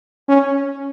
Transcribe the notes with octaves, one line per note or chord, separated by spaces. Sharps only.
C#4